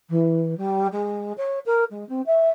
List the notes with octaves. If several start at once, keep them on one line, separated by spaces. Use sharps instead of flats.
E3
G3
G#3
C#5
A#4
G#3
C4
E5